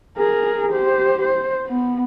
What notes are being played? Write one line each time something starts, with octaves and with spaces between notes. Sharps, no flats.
G#4 A#4
G4 C5
C5
B3